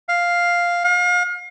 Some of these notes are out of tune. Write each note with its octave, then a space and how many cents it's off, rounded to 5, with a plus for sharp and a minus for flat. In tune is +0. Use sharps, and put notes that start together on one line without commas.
F5 +0
F5 +35